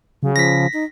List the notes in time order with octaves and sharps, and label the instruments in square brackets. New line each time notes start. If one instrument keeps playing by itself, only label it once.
[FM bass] C#3 [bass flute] F#3
[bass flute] F3 [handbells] A#6 B6
[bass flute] D#4